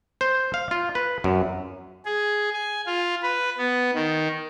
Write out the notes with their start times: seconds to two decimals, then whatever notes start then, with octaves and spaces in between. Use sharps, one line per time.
0.21 C5
0.54 F5
0.71 F4
0.95 B4
1.24 F#2
2.05 G#4
2.54 G#5
2.87 F4
3.23 B4
3.58 B3
3.94 D#3